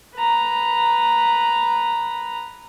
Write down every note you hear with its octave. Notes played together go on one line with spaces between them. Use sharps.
B4 A#5